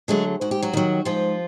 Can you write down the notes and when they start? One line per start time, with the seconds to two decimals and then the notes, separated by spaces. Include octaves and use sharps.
0.08 D3 F#3 G#3 A3 G#4
0.41 G#2 F#4
0.51 G4
0.62 F#3 F#4
0.73 D#3 F#3
1.05 G#2 F3 F4